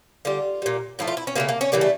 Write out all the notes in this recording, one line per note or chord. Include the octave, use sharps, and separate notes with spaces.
D3 G3 F4
A#2 G3
A2 F3 A3 E4
F4
E4
C#4
C#3 F3 A3 A#3
A#3
C#4
C#3 E3 G3 A#3
A3